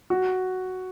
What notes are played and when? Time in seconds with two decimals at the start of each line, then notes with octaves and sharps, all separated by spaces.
0.10 F#4